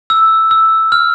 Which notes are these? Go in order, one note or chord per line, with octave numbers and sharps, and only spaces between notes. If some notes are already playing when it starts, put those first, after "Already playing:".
E6
E6
F6